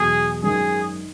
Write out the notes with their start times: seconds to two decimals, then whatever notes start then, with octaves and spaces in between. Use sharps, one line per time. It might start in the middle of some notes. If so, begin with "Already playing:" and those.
Already playing: E2 B2 F#3 G#4
0.43 G#1 F#2 D#3 G#4